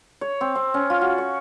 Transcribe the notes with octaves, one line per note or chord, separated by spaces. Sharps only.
C#5
C4
C4
C#4
F4
F#4
C#6